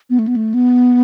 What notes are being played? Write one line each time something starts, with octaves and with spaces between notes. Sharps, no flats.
B3
A3
B3
A3
B3